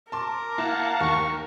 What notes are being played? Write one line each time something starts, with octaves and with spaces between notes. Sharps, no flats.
A#4 A5 C6 D6
A#3 E4 F5 F#5 A5
D#2 C#6